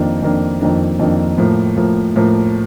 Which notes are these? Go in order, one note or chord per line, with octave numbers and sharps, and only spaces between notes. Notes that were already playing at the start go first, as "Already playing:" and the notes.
Already playing: F2 D#3 A#3 D4
F2 D#3 A#3 D4
F2 D#3 A#3 D4
F2 D#3 A#3 D4
A2 F3 A#3
A2 F3 A#3
A2 F3 A#3